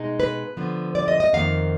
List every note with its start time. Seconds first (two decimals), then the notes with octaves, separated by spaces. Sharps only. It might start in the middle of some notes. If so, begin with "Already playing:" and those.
Already playing: B2 G#3 D#4
0.20 B4
0.57 D3 F3 B3
0.95 D5
1.08 D#5
1.20 D#5
1.33 F2 D#3 A#3 D#4 F5